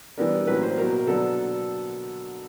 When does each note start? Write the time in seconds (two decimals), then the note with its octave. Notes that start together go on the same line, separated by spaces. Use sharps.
0.18 E3 G3 B3 D4 A#4
0.47 A2 F#3 A#3 C#4 B4
0.63 C5
0.78 B2 F#3 A#3 A#4
1.07 D3 F#3 B3 D4 A4